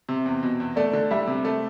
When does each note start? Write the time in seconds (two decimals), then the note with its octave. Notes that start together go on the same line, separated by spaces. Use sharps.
0.09 C3
0.26 E2
0.43 B2
0.60 E2
0.76 A3 D5
0.93 D3
1.11 G3 E5
1.27 C3
1.45 A3